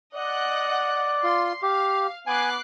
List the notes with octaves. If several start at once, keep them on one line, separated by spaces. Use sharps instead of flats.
D5 D#5 F#5 F#6
F4 C6
G4 F5
B3 G#5 D6 F#6 C7